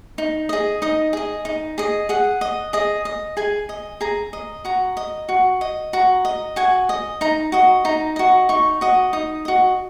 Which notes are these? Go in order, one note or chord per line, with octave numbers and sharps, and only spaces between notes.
D#4
G#4 D#5
D#4 D#5
G#4 D#5
D#4
G#4 D#5
G#4 F#5
D#5
G#4 D#5
D#5
G#4 G#5
D#5
G#4 A#5
D#5
F#4 A#5
D#5
F#4
D#5
F#4 A#5
D#5
F#4 G#5
D#5
D#4 A#5
F#4 D#5
D#4 A#5
F#4 D#5
D#4 C#6
F#4 D#5
D#4 D#6
F#4 D#5